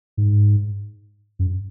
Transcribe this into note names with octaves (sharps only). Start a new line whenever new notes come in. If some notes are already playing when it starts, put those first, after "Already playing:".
G#2
F#2